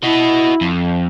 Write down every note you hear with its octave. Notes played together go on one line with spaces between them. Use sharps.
E4 F#4 D#5
F2